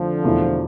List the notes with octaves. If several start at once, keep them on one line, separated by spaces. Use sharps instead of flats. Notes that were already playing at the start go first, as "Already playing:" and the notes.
Already playing: F2 D3 E3 F3 A3
E2 B2 A3 E4